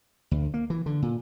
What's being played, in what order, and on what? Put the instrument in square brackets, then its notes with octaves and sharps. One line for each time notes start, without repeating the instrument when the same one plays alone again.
[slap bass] D2
A#3
E3
D3
A#2